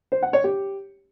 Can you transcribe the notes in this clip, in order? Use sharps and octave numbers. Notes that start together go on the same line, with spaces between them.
C5
F#5
C#5
G4